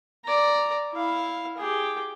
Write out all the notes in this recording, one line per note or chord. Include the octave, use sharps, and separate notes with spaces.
D5 A#5
E4 F5
G4 G#4